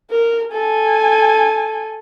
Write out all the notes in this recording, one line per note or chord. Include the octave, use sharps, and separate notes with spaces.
A#4
A4 G#5